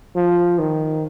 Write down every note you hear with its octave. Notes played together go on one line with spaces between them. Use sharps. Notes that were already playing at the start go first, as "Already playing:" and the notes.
F3
D#3